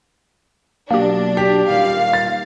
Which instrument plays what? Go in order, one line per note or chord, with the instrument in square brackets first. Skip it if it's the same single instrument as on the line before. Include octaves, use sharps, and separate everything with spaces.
[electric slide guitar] B2 F#3 [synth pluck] A#3 G4 [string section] D4
[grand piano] G4 [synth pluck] B6
[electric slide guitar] A#2 D#3 G3 [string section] F5
[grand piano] A6